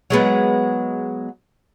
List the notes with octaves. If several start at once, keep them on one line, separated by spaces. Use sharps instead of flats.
F#3 G#3 B3